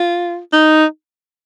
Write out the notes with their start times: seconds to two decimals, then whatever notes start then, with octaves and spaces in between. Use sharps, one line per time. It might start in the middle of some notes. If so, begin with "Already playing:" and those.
Already playing: F4
0.53 D#4